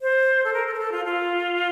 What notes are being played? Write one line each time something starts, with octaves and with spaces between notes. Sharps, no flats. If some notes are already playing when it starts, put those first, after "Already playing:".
C5
A4
A#4
A4
A#4
A4
F4
F4